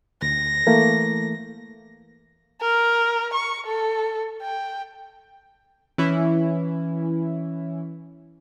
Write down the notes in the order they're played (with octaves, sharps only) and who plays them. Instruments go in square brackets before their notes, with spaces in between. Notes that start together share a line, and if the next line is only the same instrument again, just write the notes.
[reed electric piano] D2 [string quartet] A#6
[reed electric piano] E3 A3 A#3
[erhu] A#4
C#6
A4
G5
[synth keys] E3 C#4 E4